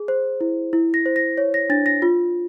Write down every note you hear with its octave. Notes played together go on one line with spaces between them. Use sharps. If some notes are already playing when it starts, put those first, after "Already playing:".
Already playing: G#4
C5
E4
E4
A#6
C5
A#6
C#5
A#6
D4 A6
A#6
F4